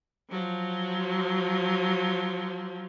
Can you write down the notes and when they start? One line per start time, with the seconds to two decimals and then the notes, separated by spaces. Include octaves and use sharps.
0.29 F3 F#3